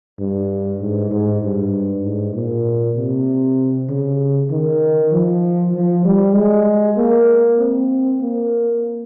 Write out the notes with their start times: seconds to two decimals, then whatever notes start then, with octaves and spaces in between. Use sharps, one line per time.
0.19 G2
0.81 G#2
1.11 G#2
1.42 G2
2.04 G#2
2.34 A#2
2.96 C3
3.89 C#3
4.51 D#3
5.12 F3
5.74 F3
6.04 G3
6.35 G#3
6.97 A#3
7.58 C4
8.20 A#3